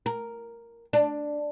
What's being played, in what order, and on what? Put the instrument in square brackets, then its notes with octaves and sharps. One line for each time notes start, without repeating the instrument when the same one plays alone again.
[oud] A#4
D4